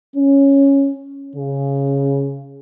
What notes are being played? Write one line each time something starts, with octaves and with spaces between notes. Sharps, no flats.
C#4
C#3